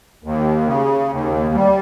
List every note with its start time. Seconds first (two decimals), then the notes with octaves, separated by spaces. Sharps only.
0.24 D#2
0.67 C#3
1.11 D#2
1.54 G3